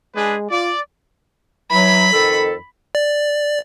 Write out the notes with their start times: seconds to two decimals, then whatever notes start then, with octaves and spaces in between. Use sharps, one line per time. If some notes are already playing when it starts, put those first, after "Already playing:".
0.15 G#3 D4 G#4 B4
0.50 F4 D5
1.71 E3 F#3 B5
2.13 F2 D#3 A4
2.95 D5